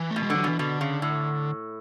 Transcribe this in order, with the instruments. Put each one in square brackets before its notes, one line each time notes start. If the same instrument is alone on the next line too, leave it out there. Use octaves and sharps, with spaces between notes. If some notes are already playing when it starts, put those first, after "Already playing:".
Already playing: [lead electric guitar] E3
A3
[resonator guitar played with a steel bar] B2
[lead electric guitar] G#3
[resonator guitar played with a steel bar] D3
[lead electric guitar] F#3
[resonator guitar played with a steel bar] B2 [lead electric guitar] E3
[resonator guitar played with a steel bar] B2 [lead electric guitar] D3
[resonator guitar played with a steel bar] C#3
A2